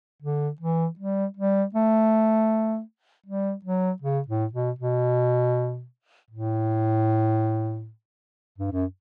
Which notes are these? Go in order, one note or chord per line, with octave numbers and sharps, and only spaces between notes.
D3
E3
G3
G3
A3
G3
F#3
C#3
A2
B2
B2
A2
G2
F#2